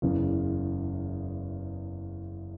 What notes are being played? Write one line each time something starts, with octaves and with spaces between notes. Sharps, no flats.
F#1 E2 C#3 E3